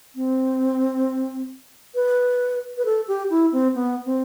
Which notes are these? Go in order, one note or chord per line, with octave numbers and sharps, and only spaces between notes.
C4
B4
B4
A4
G4
E4
C4
B3
C4